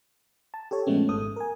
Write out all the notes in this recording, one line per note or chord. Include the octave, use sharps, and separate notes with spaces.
A5
G4 A4 C#5
A#2 F3 G#3 A3 B3 C#4
G#1 G#2 A4 D#6
A#4 G#5